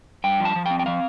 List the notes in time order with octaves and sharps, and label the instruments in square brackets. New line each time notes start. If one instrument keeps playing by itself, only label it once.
[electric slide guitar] G2 G5
F3
A5
F3
G5
C4
G5
F3 F5